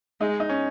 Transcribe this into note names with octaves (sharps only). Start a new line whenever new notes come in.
G#3 D#4
D#4
C#4